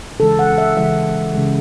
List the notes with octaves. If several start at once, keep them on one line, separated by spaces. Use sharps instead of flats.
C#3 E3 G#3 A4
F#5
E5
C#3 E3 G#3 E5
C#3 E3 G#3